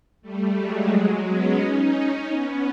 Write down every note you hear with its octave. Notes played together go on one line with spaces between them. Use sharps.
G3 A3
F#3 G#3
B3 C#4
C#4 D#4
B3 C#4